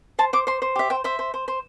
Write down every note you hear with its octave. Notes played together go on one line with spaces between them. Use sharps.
C5 A5
C5 D6
C5 C6
C5
G4 E5
C5 G5
C5 E5
C5
C5
C5